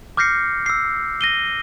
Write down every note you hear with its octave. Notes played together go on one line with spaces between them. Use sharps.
D6 F6 G6 A#6 C7 C#7
E6 C7
A#6 D#7 G7